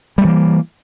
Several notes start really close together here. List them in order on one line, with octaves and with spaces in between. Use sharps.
G3 A3 E3 A#3